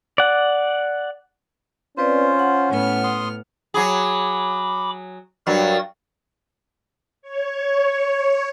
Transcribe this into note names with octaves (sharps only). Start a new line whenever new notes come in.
D5 F#5
C4 C#4 F4 B4 C5 D5
F#5
A2 B3 F6
C6 D#6
F#3 G#4 B5 D6
G2 F#3 F#4 A#4 A6
C#5